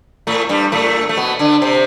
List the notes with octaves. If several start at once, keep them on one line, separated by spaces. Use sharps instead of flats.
A2 A3
G2 G3
A2 A3
A3
B2 B3
D3 D4
C3 C4